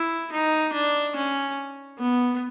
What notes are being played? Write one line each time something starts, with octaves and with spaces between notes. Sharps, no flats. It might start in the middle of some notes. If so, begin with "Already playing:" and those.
Already playing: E4
D#4
D4
C#4
B3